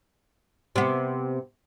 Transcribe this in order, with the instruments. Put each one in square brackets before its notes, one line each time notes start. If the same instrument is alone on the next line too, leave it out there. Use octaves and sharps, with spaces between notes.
[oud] C3 B3